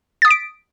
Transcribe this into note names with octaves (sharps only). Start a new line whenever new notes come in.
D#6 A6 B6 D7